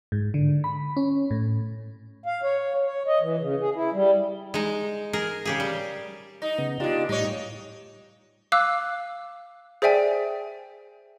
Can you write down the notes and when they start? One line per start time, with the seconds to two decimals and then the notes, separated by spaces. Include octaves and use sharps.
0.12 G#2
0.34 D3
0.64 B5
0.97 C#4
1.31 A2
2.26 F5
2.43 C#5
2.85 C#5
3.07 D#5
3.20 E3
3.39 C#3
3.61 G#4
3.75 E4
3.93 G3
4.54 G#3 D#4
5.13 G#4 A#4
5.45 C#3 G4 G#4
5.60 G3
6.42 D#4
6.58 C#3 B3
6.80 G#3 D4 D#4 F4 G4
7.09 A2 G3 D#4 C#5
8.52 F5 D6 E6 F#6
9.82 G#4 C5 D5 E5 G5 G#5